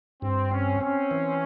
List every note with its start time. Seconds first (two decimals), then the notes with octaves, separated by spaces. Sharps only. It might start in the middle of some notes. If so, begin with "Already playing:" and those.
0.22 G2 C4
0.51 C4 C#4
0.80 C4 C#4
1.11 E3